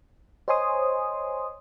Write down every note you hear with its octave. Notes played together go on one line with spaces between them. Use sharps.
C5 C#5 D#5 G#5 C6 D#6